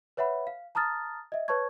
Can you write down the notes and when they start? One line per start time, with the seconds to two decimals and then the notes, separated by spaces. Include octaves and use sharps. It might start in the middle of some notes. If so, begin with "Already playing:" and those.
0.17 B4 C#5 E5 F#5 B5
0.47 F5
0.75 A5 A#5 D#6 F6 A6
1.32 D#5 E5
1.48 B4 C#5 A5 C#6 G#6